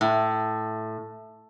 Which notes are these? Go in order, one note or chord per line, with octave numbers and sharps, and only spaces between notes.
A2